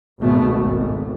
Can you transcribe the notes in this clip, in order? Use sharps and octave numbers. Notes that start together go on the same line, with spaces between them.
G#1 C#2 B2 A3
G#1